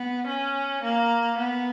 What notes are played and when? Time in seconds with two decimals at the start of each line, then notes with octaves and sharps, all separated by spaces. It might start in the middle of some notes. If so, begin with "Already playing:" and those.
Already playing: B3
0.27 C#4
0.83 A#3
1.38 B3